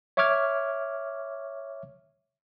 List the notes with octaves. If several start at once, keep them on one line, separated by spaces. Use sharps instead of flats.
C#5 E5 C#6 D6 F6 G#6